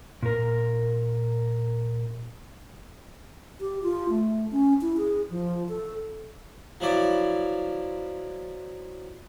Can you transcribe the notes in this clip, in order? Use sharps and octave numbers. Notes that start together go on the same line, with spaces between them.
A#2 A#4
G4
F4
A3
C#4
E4
G#4
F3
A4
F3 F#3 E4 D5